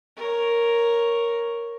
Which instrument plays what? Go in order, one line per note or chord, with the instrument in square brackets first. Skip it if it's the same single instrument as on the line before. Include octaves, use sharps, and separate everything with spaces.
[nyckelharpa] A#4 C#5